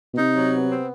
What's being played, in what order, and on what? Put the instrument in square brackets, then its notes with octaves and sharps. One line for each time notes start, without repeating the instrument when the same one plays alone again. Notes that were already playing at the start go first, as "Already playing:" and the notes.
[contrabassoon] B2
[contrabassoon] C3 [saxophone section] D#4
[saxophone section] F#3
B3
C4